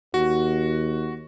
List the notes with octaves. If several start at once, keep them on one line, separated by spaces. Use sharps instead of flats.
D#2 F#4